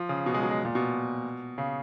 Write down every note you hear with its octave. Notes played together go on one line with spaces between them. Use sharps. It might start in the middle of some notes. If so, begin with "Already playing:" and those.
Already playing: F3
C#3
B2
G#3
F#3
G#3
A#2
B2
C#3